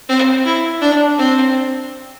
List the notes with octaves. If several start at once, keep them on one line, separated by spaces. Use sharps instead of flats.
C4
E4
D4
C4